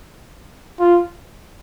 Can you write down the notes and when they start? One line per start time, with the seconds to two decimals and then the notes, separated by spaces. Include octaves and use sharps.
0.80 F4